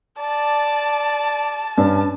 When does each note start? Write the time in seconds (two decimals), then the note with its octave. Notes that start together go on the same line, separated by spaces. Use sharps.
0.19 D5 A5
1.78 G2 C#4